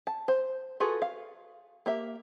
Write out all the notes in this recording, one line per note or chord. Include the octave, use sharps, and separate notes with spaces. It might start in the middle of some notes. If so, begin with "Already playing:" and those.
A5
C5
F4 F#4 G#4 A4 B4
F5
A#3 G4 E5